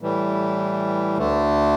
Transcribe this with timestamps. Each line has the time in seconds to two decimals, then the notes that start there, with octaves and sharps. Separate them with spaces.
0.01 A2 E3 G3
1.18 D2 D3 A3